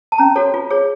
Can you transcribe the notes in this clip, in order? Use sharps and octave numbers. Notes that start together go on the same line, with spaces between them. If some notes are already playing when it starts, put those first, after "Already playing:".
A5
C#4 A#5
F#4 A4 C#5
F4
G#4 C#5